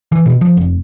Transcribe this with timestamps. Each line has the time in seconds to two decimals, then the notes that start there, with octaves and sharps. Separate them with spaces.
0.12 E3
0.26 B2
0.41 F3
0.57 F1